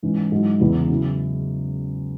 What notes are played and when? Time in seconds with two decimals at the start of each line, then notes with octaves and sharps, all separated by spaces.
0.03 G#2 E3 C#4
0.32 G#2 F#3 E4
0.60 E2 C#3 E3 B3 E4
0.89 C#3 F#3 C#4 E4